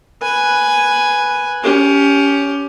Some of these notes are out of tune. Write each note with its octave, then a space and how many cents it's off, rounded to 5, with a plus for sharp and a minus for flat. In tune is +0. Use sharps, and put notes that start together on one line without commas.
B4 +0 G#5 +0
C#4 +20 G4 +0